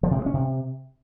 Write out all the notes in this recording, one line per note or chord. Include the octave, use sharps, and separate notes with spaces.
F3
C3
G#3
C#4
C3